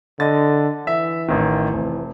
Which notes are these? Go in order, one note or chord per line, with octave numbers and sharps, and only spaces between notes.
D3 D#5 A6
E3 E5
A1 D#3
F1